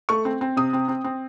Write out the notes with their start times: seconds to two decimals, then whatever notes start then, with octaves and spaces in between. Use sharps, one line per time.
0.09 A3 C#6
0.25 C4
0.41 C4
0.57 C3 D#6
0.73 C4
0.88 C4
1.04 C4